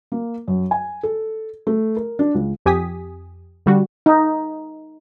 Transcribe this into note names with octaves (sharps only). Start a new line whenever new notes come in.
A#3
F#2
G#5
A4
A3
A#4
D4
C#2
F2 G4 G#5 D#6 B6
D3 G3 F#4
D#4